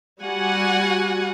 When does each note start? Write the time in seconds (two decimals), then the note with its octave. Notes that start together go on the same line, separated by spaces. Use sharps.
0.23 G3 F#4 F#5 G#5